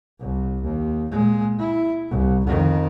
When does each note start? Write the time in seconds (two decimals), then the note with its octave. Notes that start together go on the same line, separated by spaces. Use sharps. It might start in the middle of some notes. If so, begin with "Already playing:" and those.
0.20 C2
0.63 D#2
1.11 A#2 G#3
1.59 E4
2.09 C2
2.47 F2 D#3